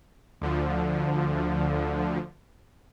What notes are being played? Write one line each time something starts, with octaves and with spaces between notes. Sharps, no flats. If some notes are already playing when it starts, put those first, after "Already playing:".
D2 D3 F3